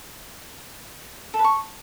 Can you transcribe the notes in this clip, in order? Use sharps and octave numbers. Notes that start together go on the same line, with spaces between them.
A4
B4
C#6